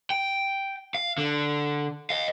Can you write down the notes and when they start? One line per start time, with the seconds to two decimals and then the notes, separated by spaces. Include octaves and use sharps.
0.10 G5
0.95 F5
1.18 D3
2.10 D#5 F5